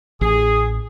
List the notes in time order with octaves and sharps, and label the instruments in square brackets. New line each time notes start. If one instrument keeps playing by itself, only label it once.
[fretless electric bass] A1 [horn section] G#4